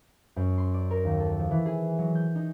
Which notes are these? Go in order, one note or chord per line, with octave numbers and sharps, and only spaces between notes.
F#2
C6
D5
A#4
D#2
A4
F3
E3
G#4
F#3
G6
D#4